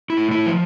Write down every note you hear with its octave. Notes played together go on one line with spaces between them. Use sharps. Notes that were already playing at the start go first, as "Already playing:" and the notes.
E4
A2
E4
F3